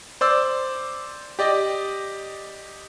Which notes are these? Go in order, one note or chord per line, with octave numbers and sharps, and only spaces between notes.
C5 D5 E6
G4 D5 D#5